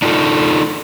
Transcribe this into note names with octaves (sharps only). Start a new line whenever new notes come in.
D4 D#4 F4 A4